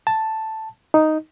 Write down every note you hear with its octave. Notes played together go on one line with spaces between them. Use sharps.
A5
D#4